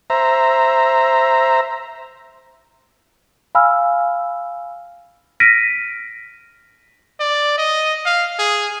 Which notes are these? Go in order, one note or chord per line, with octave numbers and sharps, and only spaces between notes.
C5 E5 A#5
F5 G#5 B5 E6 F6
F6 A#6 B6 D7 D#7
D5
D#5
F5
G#4